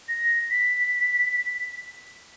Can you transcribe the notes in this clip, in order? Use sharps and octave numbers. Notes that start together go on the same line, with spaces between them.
A#6
B6